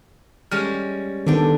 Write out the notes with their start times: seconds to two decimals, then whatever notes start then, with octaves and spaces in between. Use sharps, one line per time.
0.51 G3 G#3 C#4 F6
1.26 D3 D#3 B3 D4 G5